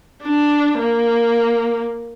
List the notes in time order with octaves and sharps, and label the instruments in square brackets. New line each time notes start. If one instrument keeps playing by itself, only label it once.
[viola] D4
A#3